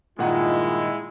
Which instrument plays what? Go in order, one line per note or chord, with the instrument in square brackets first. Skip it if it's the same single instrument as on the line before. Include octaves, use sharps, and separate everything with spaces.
[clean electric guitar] G2 D#3 [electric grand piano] A#2 F#5 [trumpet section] G#3 E4 [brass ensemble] F4